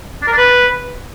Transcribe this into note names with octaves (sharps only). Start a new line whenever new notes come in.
D4
A#4
D4
B4